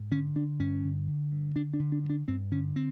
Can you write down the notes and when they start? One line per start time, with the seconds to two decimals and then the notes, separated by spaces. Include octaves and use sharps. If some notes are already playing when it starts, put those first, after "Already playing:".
Already playing: G#2
0.11 D3 C#4
0.35 D3 D4
0.59 G2 C#4
0.84 D3
1.07 D3
1.32 G2
1.55 D3 D4
1.73 D4
1.79 D3
1.92 D4
2.04 G2
2.10 D4
2.28 G2 C4
2.51 D3 C#4
2.76 C4